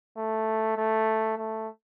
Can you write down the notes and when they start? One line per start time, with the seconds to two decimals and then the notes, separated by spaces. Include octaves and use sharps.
0.17 A3
0.77 A3
1.37 A3